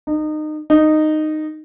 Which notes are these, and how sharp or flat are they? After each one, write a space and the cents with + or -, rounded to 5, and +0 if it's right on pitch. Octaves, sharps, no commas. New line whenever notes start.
D#4 -25
D#4 -10